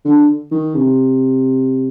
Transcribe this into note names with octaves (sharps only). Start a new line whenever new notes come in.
D3
D#3
C3